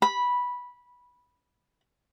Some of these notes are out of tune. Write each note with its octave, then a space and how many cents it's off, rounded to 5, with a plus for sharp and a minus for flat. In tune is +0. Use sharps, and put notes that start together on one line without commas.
B5 -10